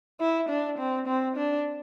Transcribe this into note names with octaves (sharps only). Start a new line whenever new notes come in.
E4
D4
C4
C4
D4